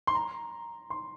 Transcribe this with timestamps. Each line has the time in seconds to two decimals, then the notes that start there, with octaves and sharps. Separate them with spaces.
0.07 C6
0.15 A#5
0.90 C6